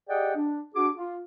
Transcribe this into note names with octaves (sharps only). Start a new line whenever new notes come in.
G4 G#4 D5 D#5 F#5 G5
D4
D4 F#4 G#4 D6
F4